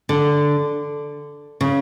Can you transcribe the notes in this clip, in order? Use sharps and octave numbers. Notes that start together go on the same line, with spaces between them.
D3
C#3